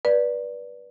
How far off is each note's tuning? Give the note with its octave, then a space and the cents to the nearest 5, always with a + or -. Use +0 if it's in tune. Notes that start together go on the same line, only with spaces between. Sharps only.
B4 -20 D5 +0